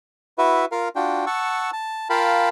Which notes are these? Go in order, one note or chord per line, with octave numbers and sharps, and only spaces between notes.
E4 F#4 B4 E5
F4 A#4 F5
D4 F4 F#4 G5
F#5 A5 C#6 E6
A5
F4 A#4 F5 G5 A5 B5